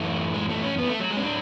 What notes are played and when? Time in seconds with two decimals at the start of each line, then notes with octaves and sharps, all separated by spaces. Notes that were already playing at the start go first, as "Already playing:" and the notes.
Already playing: F#2 E3 A3
0.34 G#3
0.49 A3
0.63 C#4
0.78 B3
0.88 A3
1.00 F#3
1.11 G#3
1.17 C#4
1.21 F#3 D4